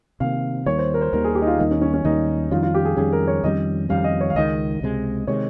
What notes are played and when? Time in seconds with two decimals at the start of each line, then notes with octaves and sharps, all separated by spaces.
0.20 C3 D#3 A#3 F5
0.66 D#2 D#3 G3 A#3 C#5
0.78 C5
0.94 A#4
1.01 C5
1.13 D#2 D#3 G3 A#3 A#4
1.24 G#4
1.35 G4
1.42 D#4
1.47 F4
1.59 D#2 D#3 G3 A#3 D#4
1.71 C#4
1.81 C#4
1.94 C#4
2.05 D#2 D#3 G3 A#3 D#4
2.51 F2 D#3 G3 C#4 F4
2.63 F4
2.74 G4
2.85 G#4
2.97 F2 D#3 G3 C#4 G#4
3.13 A#4
3.28 C#5
3.44 F2 D#3 G3 C#4 D#5
3.89 F2 D#3 G3 C#4 F5
4.04 D#5
4.21 C#5
4.30 F5
4.35 C#2 C3 D#3 G#3 D#5
4.81 C#2 C3 D#3 G#3
5.27 C3 D#3 G#3 C#5